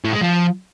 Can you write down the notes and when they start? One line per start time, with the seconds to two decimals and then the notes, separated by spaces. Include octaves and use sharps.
0.04 A2
0.13 G#3
0.21 F3